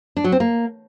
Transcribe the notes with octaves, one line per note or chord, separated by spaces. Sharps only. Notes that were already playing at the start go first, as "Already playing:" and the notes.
D4
F#3
C4
A#3